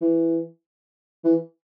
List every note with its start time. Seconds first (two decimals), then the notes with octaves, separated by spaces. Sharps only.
0.01 E3
1.24 E3